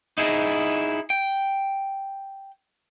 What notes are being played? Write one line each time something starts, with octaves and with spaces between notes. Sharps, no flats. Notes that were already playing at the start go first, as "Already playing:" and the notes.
D#4 E4 G#4
G5